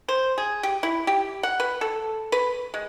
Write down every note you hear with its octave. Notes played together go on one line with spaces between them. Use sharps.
C5
G#4
G4
E4
G4
F#5
B4
A4
B4
G#3